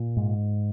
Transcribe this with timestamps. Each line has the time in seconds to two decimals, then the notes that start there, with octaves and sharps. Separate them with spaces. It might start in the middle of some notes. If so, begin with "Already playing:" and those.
Already playing: A#2
0.17 G#2